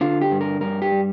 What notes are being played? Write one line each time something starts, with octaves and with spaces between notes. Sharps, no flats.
D3 F4
G4
G2
A#4
G2 A#4
G4
G3